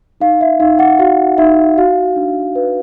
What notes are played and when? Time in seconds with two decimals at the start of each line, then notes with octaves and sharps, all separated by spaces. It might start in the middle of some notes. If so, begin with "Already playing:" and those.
0.20 D#4 F5
0.41 E5
0.60 D#4 F5
0.79 F#5
0.99 F#4 F5
1.38 D#4 E5
1.78 F#4 F5
2.16 D4
2.55 B4